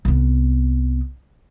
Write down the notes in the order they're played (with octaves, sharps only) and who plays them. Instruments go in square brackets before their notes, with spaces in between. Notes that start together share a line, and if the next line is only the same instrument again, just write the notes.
[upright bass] C2 B3